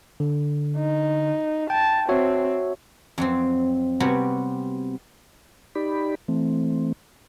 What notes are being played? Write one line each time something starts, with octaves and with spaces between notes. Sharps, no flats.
D3
D#4
G5 A5
C4 F#4 C#5 E5
F2 F#3 C4
C3 G3 B3 F#4 G4 C#5
D#4 G4 D5 B5
E3 A3 C4